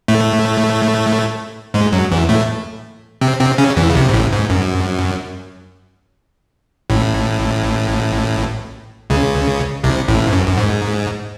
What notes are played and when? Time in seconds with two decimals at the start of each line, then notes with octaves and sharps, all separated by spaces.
0.08 A2 A3
1.74 G#2 G#3
1.92 F#2 F#3
2.12 E2 E3
2.29 A2 A3
3.21 C3 C4
3.39 C3 C4
3.58 C#3 C#4
3.76 E2 E3
3.90 C#3
3.95 C2 C3
4.09 G#2
4.14 A1 A2
4.33 G#2
4.50 F#2
6.90 A1 A2
9.10 C#2 C#3
9.84 C2 C3
10.08 A1 A2
10.27 G#2
10.33 F#2
10.47 F#2
10.57 G#2